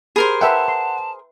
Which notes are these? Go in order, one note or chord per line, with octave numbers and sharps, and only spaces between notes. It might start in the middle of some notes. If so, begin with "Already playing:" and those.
G4 G#4 A#4 C5 B5
B4 E5 F#5 G5 A5
C6